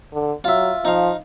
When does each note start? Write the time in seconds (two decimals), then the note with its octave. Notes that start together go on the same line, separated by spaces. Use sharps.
0.13 D3
0.44 F#3 F4 E5
0.85 F3 D#4 F5